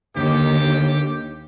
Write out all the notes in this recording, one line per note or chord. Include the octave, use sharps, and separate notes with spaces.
D#2 D3 G4